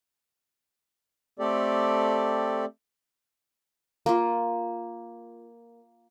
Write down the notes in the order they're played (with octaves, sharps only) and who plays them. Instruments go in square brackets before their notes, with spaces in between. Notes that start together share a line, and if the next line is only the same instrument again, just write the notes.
[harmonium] A3 C4 G4 A4 D5
[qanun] A#3 F4